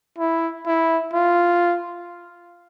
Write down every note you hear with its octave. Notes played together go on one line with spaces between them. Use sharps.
E4
E4
F4